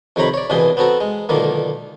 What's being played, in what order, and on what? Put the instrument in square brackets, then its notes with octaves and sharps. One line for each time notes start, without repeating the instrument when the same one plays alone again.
[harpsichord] F2 C3 D#3 C#5 A#5 B5
C#5 D5
C2 G2 B2 E3 G#4 C6
B3 C4 F#4 A4 A#5
G#3
B1 A#2 D3 D#3 A#3